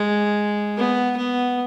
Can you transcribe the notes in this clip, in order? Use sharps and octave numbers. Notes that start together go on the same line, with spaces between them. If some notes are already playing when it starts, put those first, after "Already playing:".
Already playing: G#3
B3
B3